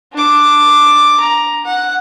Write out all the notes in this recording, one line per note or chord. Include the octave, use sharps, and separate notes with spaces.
D4 D6
A#5
F#5